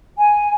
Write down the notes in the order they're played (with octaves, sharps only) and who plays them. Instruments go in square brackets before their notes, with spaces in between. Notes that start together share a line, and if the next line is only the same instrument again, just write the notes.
[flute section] G#5